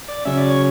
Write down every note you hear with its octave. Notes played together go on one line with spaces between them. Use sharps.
D5
C#3 F#3 C#4 E5
D5
C#5